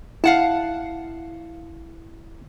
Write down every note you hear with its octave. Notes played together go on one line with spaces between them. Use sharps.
E4 F5 F#5 A5